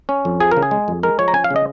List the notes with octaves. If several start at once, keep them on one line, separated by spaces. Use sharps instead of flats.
C#4
F2
F3 G#4
A#4
C#3
G#4
G#3
F2
G#3 A#4
F3 C#5
A#5
C#4 G#5
F5
C#3
D#5